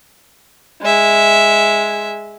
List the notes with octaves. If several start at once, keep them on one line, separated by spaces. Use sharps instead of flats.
G#3 E5